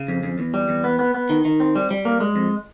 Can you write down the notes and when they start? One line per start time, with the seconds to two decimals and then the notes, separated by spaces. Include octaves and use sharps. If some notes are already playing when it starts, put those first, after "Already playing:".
Already playing: C#3
0.08 F2
0.23 F2
0.39 E2
0.54 G3
0.69 E2
0.84 B3
0.99 B3
1.14 B3
1.30 D#3
1.45 D#3
1.60 C4
1.76 G3
1.91 G3
2.05 A#3
2.20 G#3
2.36 F2